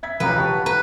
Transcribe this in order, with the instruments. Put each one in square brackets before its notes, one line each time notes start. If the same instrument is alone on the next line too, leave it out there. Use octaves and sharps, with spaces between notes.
[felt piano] E5 G#6 B6
[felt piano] E1 C#2 A#5 [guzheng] B4
[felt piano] G4 A5 C#6
F#5
[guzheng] B4 [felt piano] A#5